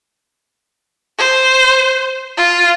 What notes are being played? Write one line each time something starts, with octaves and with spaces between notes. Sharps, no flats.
C5
F4